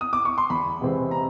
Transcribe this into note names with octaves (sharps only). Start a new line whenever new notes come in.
D#6
D6
C#6
C6
E2 B5
C3 E3 G#3 C4
A#5